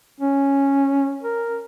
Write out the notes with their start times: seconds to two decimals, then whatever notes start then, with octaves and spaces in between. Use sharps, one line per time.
0.20 C#4
1.23 A#4